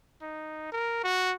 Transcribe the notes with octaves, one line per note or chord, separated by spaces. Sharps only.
D#4
A#4
F#4